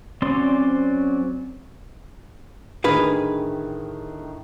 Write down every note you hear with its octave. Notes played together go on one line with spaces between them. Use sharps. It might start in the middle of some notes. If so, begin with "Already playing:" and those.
F#3 C4 C#4 D5 C6
A2 D3 D#3 G#4 B4 F5